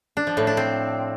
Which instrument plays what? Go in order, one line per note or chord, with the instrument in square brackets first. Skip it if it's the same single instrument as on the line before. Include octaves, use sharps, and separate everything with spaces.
[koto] D4
F3
A2
D4
C4